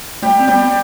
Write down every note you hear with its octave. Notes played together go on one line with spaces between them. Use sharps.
G3 A3 G4
C4
G3 B3 G4